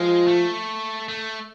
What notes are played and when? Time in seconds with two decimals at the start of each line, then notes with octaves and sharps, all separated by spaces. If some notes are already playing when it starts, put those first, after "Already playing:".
Already playing: F3 G#3
0.27 A3
1.09 A3